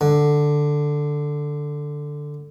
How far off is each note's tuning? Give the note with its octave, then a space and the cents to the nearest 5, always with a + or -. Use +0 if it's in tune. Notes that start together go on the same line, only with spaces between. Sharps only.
D3 +5